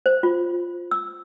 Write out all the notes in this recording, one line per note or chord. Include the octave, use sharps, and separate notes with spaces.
C5
F4
E6